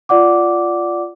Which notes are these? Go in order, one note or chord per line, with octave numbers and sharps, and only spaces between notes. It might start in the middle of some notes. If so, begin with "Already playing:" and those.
F4 D5 F#5 D6